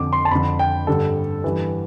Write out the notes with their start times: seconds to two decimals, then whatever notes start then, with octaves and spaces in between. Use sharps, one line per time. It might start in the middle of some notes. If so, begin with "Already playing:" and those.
Already playing: F2 D3 D6
0.13 C6
0.25 A5
0.31 F2 B5
0.35 D3
0.59 G5
0.87 G2 D3 A4
1.44 G2 E3